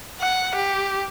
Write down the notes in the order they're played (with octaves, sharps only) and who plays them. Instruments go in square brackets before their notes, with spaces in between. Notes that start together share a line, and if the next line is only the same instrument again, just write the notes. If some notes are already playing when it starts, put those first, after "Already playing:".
[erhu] F#5
G4